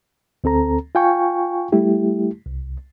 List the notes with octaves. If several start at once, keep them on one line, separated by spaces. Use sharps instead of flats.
D2 C4 A4 A#5
F4 F5 G5 G#5 C#6
G3 A3 E4 G4
C2